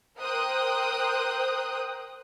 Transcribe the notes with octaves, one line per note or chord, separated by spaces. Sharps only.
A#4 C5 G5 D#6 F#6